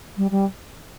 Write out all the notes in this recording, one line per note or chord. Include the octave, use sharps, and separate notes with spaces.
G3
G3